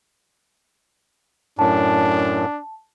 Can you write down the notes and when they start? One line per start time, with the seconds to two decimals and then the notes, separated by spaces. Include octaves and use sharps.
1.59 F#2 A2 D4 A5